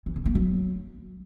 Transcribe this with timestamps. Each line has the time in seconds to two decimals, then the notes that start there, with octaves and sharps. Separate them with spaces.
0.06 E3
0.16 C#3
0.25 A#3
0.35 F#3